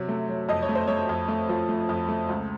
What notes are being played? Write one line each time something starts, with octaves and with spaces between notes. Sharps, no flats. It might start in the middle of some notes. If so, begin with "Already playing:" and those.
Already playing: C3 F#3
A3
F#3
F2 D#5
C#5
A3
C5
A3 C#5
F2
A3
F3
A3
F2
A3
C#2